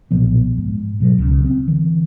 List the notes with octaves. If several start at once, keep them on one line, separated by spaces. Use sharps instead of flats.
B1 A#2 F3 B3
G#2
B2 F#3
C#2 C#3
C4
D3 E3